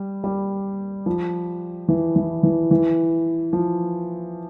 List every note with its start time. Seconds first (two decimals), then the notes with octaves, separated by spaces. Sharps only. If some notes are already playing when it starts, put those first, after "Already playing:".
Already playing: G3
0.24 G3
1.06 F3
1.88 E3
2.16 E3
2.43 E3
2.71 E3
3.53 F3